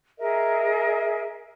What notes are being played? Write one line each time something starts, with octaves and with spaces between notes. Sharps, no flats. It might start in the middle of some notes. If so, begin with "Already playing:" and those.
G#4 A#4 D#5 E5